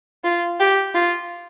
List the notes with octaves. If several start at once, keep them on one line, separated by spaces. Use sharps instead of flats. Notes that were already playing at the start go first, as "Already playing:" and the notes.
F4
G4
F4